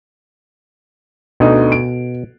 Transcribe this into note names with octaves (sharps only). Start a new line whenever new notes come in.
D2 B2 D3 D#4
D7